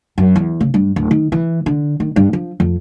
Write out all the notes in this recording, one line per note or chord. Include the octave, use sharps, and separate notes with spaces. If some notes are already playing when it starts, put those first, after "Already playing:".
F#2
E2
C#3
G2
D1
D#3
E3
D3
D#3
G2
F3
F2